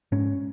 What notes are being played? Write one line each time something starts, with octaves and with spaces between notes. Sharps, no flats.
G#2 C#4